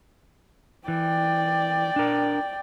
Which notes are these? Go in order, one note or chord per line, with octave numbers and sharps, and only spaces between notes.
E3 D5 G5
D4 A#4